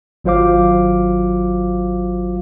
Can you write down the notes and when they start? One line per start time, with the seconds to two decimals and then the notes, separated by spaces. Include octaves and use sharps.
0.24 G#1 F#3 F4 C5 F5 D6